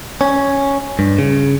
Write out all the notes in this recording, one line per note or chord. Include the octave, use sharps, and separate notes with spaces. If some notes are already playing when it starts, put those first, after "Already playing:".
C#4
G2
C#3